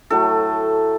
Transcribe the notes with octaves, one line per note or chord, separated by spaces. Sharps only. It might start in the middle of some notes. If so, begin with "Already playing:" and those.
A2 F#3 A3 A4